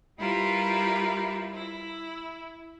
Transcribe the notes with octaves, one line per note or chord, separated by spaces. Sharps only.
G3 E4 F4 G4 A#4 B4
E4